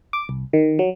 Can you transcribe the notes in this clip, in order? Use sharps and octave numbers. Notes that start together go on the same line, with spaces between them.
D6
C2
D#3
F#3